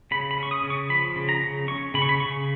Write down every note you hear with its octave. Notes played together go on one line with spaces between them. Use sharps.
C#3 B5
B5
C#4 C#6
D#6
C#3
C#6
F3 B5
C#3
A#5
C#3
C#4 C#6
C#3 B5
C#6
B5
C#3 C#6